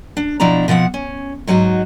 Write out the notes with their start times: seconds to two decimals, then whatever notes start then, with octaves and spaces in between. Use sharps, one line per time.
0.17 D4
0.40 B2 F3 D4 E4 A#5
0.68 B2 F3 C4 F#5
0.94 C#4
1.47 G#2 F#3 D#4 F#4